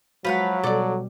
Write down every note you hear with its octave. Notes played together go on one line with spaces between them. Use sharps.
F3 F#3 G#3 F#4 B4 F5 F#5
B2 G3 A4 D5 D6